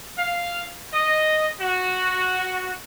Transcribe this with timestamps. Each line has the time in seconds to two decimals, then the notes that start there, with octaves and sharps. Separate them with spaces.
0.18 F5
0.93 D#5
1.61 F#4